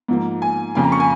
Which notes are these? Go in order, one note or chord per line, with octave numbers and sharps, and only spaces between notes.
G#2 F3 A#3
G#5
F2 C#3 A#3 G#5
A#5
C#6
G#5